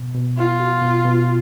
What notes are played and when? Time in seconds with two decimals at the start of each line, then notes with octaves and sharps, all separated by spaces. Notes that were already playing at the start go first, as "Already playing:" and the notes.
Already playing: B2
0.15 B2
0.38 B3 F4
0.60 F#4
0.82 B2
1.05 B2